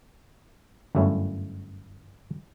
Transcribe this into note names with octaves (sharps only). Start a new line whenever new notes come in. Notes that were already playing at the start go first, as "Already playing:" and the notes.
G1 F#2 A3 C#4 E4